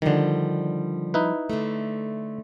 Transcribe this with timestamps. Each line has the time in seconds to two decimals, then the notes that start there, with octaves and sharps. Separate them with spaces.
0.02 D3 D#3 F3 G3
1.14 D#4 E4 B4
1.50 D3 A3